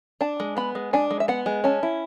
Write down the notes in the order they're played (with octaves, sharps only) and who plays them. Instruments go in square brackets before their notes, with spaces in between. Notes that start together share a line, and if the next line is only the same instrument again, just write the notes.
[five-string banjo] D4 A5
G#3
B3 B5
G#3
D4 G#5
G#3
E5
B3 F#5
G#3
C#4 A5
E4